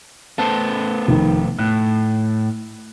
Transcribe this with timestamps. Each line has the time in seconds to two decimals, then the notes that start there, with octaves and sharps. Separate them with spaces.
0.38 A3 B3 C5 A5
1.08 F1 D#3
1.59 A2 F#6